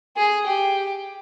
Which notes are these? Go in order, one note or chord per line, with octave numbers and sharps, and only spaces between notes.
G#4
G4